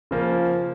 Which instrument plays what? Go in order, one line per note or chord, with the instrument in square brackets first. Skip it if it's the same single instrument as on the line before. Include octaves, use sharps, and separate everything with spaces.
[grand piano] C#3 F3 A#3